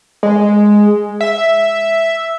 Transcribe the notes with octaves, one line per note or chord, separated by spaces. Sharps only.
G#3
E5